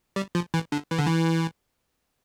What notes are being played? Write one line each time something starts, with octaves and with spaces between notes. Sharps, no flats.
G3
F3
E3
D3
E3
D3
E3